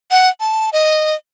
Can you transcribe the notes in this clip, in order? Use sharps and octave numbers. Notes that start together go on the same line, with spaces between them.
F#5
A5
D#5